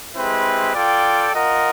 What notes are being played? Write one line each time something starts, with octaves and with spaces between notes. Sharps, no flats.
G#3 C4 E4 G4 B4
F4 A4 D5 G5
F4 A#4 D#5 F#5